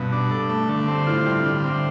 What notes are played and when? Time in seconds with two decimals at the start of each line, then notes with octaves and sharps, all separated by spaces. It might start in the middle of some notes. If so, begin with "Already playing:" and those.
Already playing: G2 B2
0.12 D4
0.31 A4
0.49 A3
0.69 D3
0.88 C4
1.07 A2 F4
1.26 G3
1.46 D3
1.64 C4